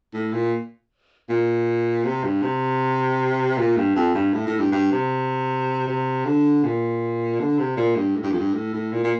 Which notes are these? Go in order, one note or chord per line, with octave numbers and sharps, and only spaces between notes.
A2
A#2
A#2
C3
G2
C3
A#2
G2
F2
G2
A2
A2
G2
G2
C3
C3
D3
A#2
D3
C3
A#2
G2
A2
G2
F2
G2
A2
A2
A#2
A#2